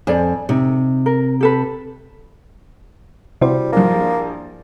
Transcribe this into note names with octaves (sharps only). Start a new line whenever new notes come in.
F2 C5 D5 G#5
C3 D#4
A#4
G4 A4 B4
C3 G3 E4 F#4 C5
A#1 G2 F3 A#3